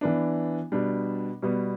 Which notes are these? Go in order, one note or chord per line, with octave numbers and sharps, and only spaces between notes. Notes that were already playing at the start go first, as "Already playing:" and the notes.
E3 B3 D4
B2 G3 D4
B2 G3 B3